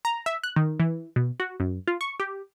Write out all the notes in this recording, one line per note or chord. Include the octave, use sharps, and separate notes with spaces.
A#5
E5
F#6
D#3
E3
B2
F#4
F#2
F4
C#6
G4